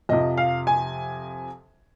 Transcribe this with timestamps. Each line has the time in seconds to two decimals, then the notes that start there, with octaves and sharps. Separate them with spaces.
0.09 F2 C3 F3 D#5
0.37 F5
0.67 G#5